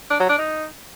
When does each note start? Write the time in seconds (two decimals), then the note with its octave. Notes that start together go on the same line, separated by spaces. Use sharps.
0.10 D4
0.20 F#3
0.29 D4
0.39 D#4